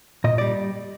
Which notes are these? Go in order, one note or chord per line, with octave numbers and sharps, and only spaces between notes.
A#2 D#5
G3 D5